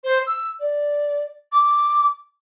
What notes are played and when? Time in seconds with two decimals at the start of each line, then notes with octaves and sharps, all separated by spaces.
0.04 C5
0.27 E6
0.60 D5
1.52 D6